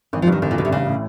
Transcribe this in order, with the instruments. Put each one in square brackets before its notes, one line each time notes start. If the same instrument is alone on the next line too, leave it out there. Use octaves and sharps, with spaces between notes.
[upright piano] G#1 [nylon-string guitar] E3
[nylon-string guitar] F3
[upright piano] G2
[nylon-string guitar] D#3
[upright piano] G#1 [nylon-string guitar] D3
[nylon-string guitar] A#2
[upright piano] G2 [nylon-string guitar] B2
[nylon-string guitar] C3
[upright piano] A1 [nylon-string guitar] C#3
[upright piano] A2